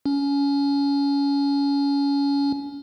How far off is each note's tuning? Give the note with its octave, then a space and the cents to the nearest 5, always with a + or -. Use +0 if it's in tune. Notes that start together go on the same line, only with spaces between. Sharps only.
C#4 +25